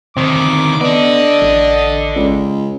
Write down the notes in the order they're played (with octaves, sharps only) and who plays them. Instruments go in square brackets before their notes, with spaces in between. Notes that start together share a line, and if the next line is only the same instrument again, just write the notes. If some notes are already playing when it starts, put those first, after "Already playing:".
[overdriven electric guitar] D2 D#3 [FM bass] C4 [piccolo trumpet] D6
[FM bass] B3 [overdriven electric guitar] A4 D5 [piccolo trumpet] D#5
[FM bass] A1
[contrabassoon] C#2